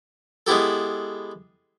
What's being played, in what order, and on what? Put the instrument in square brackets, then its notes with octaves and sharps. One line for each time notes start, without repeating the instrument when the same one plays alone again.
[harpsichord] G#3 B3 E4 G4 A4